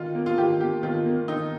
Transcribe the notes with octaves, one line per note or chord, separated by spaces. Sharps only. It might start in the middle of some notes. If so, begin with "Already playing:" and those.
Already playing: D#3 F4
A#3
F4
D#3 G4
A#3 G4
D#3 F4
A#3
D#3 D#4